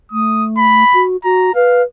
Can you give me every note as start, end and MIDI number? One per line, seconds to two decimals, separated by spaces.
0.12 0.84 57
0.12 0.45 87
0.58 1.05 83
0.94 1.17 66
1.24 1.51 66
1.24 1.51 82
1.55 1.82 71
1.55 1.83 77